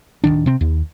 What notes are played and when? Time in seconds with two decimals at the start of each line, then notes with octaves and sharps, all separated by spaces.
0.24 D1 C#2 D#3 D4
0.46 C3 C4
0.61 D#2